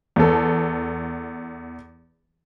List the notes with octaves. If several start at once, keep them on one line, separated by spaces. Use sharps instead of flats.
E2 A4